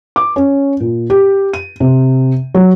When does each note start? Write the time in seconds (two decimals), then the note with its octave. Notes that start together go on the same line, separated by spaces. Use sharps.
0.16 D6
0.36 C#4
0.80 A#2
1.10 G4
1.53 D#7
1.80 C3
2.55 F#3